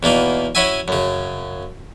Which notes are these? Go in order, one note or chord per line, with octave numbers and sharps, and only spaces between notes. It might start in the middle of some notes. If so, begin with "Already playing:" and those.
E2 B2 A#3 D#4
C#4 E4 F#4 E5 G#5
F#2 C#3